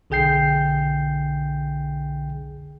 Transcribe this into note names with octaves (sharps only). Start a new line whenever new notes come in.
B1 D3 G#4 G5 G6 C7